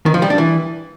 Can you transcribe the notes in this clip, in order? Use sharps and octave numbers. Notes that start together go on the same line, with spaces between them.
D#3
F3
G3
D4
E3